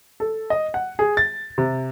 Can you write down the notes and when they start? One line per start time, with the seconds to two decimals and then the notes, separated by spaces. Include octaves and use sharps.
0.20 A4
0.50 D#5
0.74 F#5
0.99 G#4
1.17 A6
1.58 C3